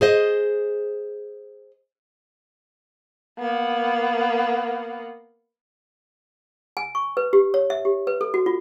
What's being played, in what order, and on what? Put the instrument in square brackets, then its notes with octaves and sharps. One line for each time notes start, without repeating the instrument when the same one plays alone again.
[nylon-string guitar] G#4 C5 D#5
[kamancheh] A#3 B3
[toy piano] G#5
C#6
B4
G4
C#5
E5
G4
B4
A4
F#4
F4